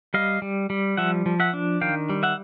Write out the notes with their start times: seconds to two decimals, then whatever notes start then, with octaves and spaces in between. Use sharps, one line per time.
0.14 G3 D#5 F5
0.42 G3
0.70 G3
0.97 F3 E5 F#5
1.26 F3
1.40 E5 F#5
1.53 D4
1.81 D#3 F5 G5
2.09 G3
2.23 E5 F#5